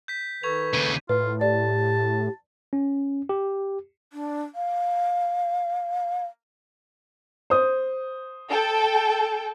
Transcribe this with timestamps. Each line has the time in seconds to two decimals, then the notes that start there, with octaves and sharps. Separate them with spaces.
0.08 G6 B6
0.43 D#3 A4 B4 C#6 G#6 F7
0.74 D#2 C#3 D#7
1.09 A2 F4 B4
1.41 G4 D5 A5
2.73 C#4
3.29 G4
4.13 D4
4.55 F5
7.50 C5 D#6
8.50 A4 G5